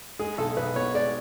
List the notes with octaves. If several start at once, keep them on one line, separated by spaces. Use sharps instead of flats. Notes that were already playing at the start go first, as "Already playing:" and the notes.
G#3 G#4
B1 A4
B1 B4
B2 C#5
G#3 D5